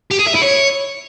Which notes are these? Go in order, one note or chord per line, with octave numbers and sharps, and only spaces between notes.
G4
G#4
E5
E4
C#5